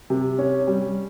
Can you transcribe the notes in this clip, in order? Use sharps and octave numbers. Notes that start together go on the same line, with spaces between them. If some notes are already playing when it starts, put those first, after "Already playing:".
C3
C#4
G3